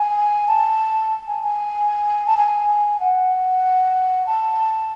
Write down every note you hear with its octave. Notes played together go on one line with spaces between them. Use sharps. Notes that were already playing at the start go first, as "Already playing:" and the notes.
Already playing: G#5
A5
G#5
G#5
A5
G#5
F#5
A5